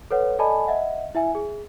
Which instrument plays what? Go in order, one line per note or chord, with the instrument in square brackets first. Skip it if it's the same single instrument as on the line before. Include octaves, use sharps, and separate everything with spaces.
[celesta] A4 B4 C#5 F#5
A4 D5 D#5 G#5 A5 B5
D#5 E5 F#5
E4 E5 G#5
G#4